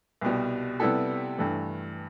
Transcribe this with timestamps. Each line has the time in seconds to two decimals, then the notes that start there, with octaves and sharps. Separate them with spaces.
0.21 C2 B2 G3
0.80 C3 G3 B3 E4 A4
1.38 G2 E3 A3